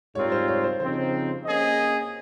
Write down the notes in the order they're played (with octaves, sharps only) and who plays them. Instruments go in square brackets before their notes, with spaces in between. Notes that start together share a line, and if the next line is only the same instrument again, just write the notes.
[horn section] G#2 G3 C4 F4 A#4 [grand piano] C#5
[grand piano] C5
C#5
C5
[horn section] C#3 F3 C4 D#4 [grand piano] C5
[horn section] A#3 C#4 G#4 D#5